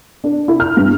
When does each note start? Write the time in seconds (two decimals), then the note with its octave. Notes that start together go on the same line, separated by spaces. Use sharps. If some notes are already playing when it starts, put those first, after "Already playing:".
0.24 D4
0.48 E4
0.60 F6
0.77 G2